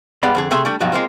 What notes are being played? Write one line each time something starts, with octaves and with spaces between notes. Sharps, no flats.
G2 G#3 B3 D5 B5
F2 D3 G#4
C3 A3 G#4 E5 G#5 C6
G3 A3 D4
G2 B2 F3 F#3 D#4
G#3 A#3 C4 F4